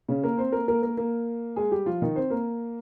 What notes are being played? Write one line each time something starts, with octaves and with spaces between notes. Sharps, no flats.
C#3 C#4
A#3 A#4
C4 C5
A#3 A#4
A#3 A#4
A#3 A#4
A#3 A#4
G#3 G#4
G3 G4
F3 F4
D#3 D#4
C4 C5
A#3 A#4